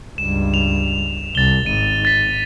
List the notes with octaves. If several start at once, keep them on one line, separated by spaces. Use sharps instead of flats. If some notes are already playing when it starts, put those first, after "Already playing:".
C#2 G2 E7
F7
C2 A6 G7
G#1 D#7
A6 B6